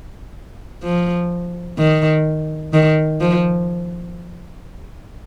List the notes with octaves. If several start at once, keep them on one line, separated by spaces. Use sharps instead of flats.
F3
D#3
D#3
F3